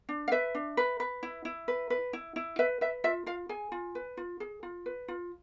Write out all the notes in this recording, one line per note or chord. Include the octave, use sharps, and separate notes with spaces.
D4
F5
B4 E5
D4
B4
B4
E4
E4
B4
B4
E4
E4
B4 E5
B4 E5
F4 E5
F4 F5
G#4 G#5
F4
B4
F4
G#4
F4
B4
F4